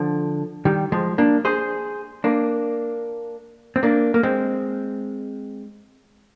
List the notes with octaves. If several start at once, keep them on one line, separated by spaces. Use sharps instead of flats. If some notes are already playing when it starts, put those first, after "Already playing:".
Already playing: D3 F3
D#3 G3
F3 G#3
A#3 D4
G#4 C5
A#3 D4
C4
A#3 D4
A#3
G#3 C4